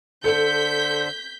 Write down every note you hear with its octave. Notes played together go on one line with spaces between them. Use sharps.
D3 A4 C5 G6 B6